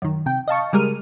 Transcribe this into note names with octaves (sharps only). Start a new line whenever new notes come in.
F#2 D#3
C3 G5
D#5 F5 A5 C#6
C#3 G3 G#3 A#4 F6 D#7